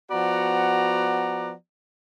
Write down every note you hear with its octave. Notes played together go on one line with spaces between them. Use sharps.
F3 B3 F#4 D5 F#5 A#5